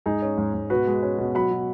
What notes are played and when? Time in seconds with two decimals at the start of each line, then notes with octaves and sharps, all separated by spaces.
0.06 G#2 D#4 G#4
0.22 C#4
0.38 G#2
0.54 G#2
0.70 B2 F#4 B4
0.87 G#3
1.03 C#4
1.18 B2
1.35 F#3 F#5 B5
1.51 B2